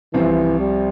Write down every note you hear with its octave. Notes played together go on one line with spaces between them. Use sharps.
C2 C3 E3 F3 C4 F4
G3